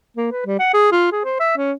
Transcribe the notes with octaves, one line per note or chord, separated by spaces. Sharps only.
A#3
B4
G3
F#5
G#4
F4
G#4
C5
E5
C#4